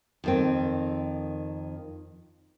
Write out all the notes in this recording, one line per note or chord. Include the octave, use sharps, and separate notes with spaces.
F2 D#3 C4